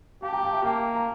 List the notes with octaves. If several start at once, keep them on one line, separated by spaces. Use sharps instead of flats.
G4 F5 A5
G5 A#5
F5 A5
E5 G5
A#3 F5 A5
A#5